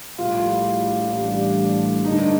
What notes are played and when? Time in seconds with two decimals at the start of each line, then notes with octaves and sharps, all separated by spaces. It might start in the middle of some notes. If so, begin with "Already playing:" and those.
0.18 A#1 A2 G3 F4
1.12 A1 A2 G3 D4
2.04 G2 D3 G3 A#3 D4 D#4